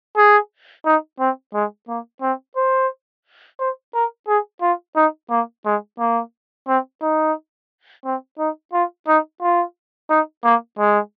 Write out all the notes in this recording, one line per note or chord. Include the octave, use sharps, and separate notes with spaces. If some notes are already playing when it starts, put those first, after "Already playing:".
G#4
D#4
C4
G#3
A#3
C4
C5
C5
A#4
G#4
F4
D#4
A#3
G#3
A#3
C4
D#4
C4
D#4
F4
D#4
F4
D#4
A#3
G#3